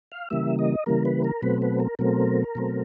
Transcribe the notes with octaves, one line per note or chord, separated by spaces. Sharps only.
F5
C#3 E3 G3 A#3 E5
D#5
C#3 E3 G3 A#3 A#4
B4
A#4
B2 F#3 A3 C4 B4
B4
A#4
B2 F#3 A3 C4 A#4
B2 F#3 A3 C4